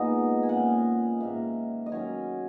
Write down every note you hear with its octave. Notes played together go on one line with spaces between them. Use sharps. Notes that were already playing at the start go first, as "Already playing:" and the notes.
Already playing: A#2 G#3 B3 D#4 D#5
G#5
A#2 G#3 C#4 F#5
G#2 D#3 A#3 E5
D#5
D#3 F#3 C#4 C#5